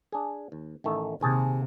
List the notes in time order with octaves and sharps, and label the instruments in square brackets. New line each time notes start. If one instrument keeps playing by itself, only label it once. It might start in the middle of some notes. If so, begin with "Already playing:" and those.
[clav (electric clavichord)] D4 G#4
D#2
A1 D#3 A3
[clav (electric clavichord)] D#2 G#4 A5 [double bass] C3